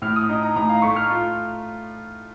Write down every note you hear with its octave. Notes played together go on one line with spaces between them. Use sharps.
A2 F6
D#6
D#4
A#5
A2 A#5
F5
A3 C#6
F6
F4